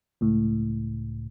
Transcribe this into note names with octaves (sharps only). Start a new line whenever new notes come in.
C#2 A2